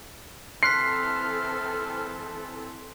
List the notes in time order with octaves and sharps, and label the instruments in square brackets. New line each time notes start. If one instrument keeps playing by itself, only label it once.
[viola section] E3 C4 A4 [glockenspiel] C6 F#6 B6 [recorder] F6 [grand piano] C7